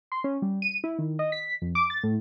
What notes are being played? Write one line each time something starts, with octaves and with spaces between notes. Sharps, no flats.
C6
C#4
G3
D#7
E4
D#3
D#5
B6
F2
D6
A6
A2